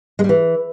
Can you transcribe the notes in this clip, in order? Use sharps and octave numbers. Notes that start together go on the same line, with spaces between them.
G#3
G3
E3